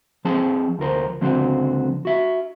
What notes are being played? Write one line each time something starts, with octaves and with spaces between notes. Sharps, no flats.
F3 C4 G#4 A5
D2 F3 A#4 C5
C#2 D3 F3 C4 F#4 C5
F#4 E5